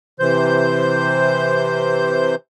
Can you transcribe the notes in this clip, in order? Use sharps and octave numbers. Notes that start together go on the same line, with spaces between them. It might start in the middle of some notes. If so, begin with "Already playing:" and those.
C3 E3 C5 G6